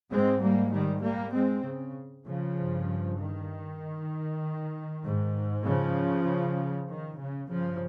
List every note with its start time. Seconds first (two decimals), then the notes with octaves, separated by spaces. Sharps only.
0.11 G#2 G#3 C4
0.42 G3 A#3
0.73 D#3 G3
1.04 G3 A#3
1.35 G#3 C4
1.65 C#3
2.27 C#3 F3
2.58 G2
3.19 D#3
5.04 G#2
5.65 C#3 F3
6.88 D#3
7.19 C#3
7.50 G2 C#3 F3